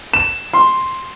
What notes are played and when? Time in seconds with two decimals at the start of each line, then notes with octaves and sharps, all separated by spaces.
0.14 E7
0.53 C6